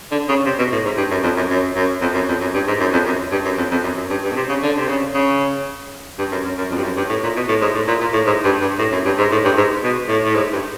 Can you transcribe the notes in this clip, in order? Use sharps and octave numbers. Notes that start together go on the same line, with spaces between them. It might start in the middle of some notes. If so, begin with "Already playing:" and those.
D3
C#3
C3
B2
A2
G#2
G2
F#2
F2
F#2
F#2
F#2
F2
F#2
F2
F#2
G2
G#2
F#2
F2
F#2
G2
F#2
F2
F2
F#2
F#2
G2
G2
B2
C3
C#3
D3
C3
C#3
C#3
G2
F#2
F#2
F#2
F2
G2
F#2
G2
A2
A#2
B2
A2
G#2
A2
A#2
A#2
A2
G#2
G2
G2
A2
F#2
G2
G#2
A2
G2
G#2
B2
A2
A2
G#2
G2